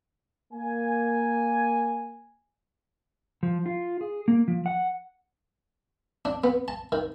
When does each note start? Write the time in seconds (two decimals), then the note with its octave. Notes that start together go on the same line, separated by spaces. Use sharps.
0.53 A#3 G#5
3.43 F3
3.66 F4
4.01 G#4
4.28 A#3
4.48 F3
4.66 F#5
6.25 D4
6.44 B3
6.68 A5
6.92 D#3